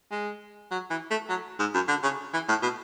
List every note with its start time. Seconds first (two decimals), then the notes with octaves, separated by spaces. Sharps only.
0.11 G#3
0.71 F#3
0.90 E3
1.10 A3
1.29 F#3
1.59 G#2
1.74 F#2
1.88 D3
2.03 C#3
2.33 E3
2.48 A2
2.62 B2